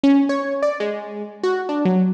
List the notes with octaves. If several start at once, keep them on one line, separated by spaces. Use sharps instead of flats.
C#4
C#5
D5
G#3
F#4
D4
F#3